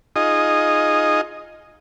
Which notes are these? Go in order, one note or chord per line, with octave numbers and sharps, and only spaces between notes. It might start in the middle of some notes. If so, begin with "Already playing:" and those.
D#4 F4 G#4 D#5